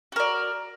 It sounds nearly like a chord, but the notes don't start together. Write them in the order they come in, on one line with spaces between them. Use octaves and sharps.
F#4 A#4 D5